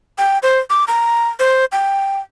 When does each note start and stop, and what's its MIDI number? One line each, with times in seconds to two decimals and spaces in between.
0.18 0.38 79
0.43 0.59 72
0.70 0.84 86
0.88 1.29 82
1.39 1.65 72
1.72 2.20 79